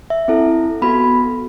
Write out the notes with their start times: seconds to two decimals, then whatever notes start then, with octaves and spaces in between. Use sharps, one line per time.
0.10 E5
0.28 C4 E4 A4
0.82 B3 F#4 A4 B5